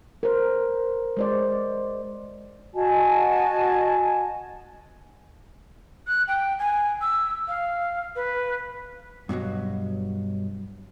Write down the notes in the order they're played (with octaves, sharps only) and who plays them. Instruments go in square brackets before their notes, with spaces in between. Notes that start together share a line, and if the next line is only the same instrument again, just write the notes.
[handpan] A#4 C5
G#3 C5 D5
[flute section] F#4 D#5 G#5 A5
[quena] F#6
G5
G#5
E6
F5
B4
[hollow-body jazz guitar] G2 B2 D#3 F#3